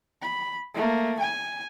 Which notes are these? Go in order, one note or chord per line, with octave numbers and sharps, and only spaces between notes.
B5
A3 A#3
G#5